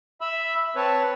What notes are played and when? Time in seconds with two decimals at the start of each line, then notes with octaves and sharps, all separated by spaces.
0.21 E5 B5 E6
0.76 C4 B4 C#5 A5